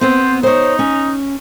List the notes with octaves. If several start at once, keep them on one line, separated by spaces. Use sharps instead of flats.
B3 C4 C5
D#4 C5 C#5
C#4